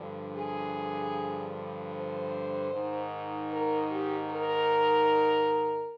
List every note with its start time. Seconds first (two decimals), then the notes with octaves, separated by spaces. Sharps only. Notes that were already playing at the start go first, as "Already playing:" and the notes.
Already playing: G2 D3 F3
0.33 G#4
1.91 C5
2.70 G#2 D#3
3.49 A#4
3.89 G4
4.28 A#4